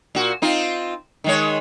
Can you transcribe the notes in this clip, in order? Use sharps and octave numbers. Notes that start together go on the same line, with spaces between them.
A#2 F#4
C4 D#4 F4
D#3 G#3 C#5